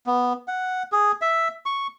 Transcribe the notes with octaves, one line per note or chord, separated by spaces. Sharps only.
B3
F#5
G#4
E5
C#6